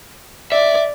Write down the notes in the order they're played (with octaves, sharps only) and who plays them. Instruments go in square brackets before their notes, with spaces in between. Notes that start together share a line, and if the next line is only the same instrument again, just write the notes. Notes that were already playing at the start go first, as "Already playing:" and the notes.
[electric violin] D5 [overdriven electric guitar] E5